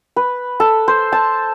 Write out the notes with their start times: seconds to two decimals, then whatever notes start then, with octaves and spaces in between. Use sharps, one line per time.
0.16 B4
0.60 A4
0.88 C5
1.12 A5